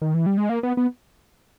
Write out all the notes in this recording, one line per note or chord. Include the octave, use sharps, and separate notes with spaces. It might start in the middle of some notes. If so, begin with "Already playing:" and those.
D#3
E3
G3
G#3
A#3
B3
B3